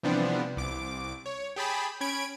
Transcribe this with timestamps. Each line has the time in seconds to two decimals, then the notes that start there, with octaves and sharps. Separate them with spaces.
0.03 C3 E3 F3 G3 B3 D4
0.57 C2 D6
1.26 C#5
1.56 G4 G#4 A5 B5
2.01 C#4 B5 G#6 D7